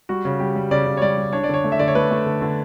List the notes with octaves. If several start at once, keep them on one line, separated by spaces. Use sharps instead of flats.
G3 F#4
C#3
G3 G4
G3
C#3 D5
C#3
C#5
G3 D5
G3
D4 C#5
D5
D3 C#5
A3
E5
D3 D5
C#5
A3 B4
A3
D3
D3